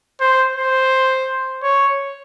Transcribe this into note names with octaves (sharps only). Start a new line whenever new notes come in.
C5
C5
C#5